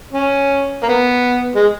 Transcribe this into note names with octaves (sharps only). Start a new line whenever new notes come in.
C#4
A#3
B3
G#3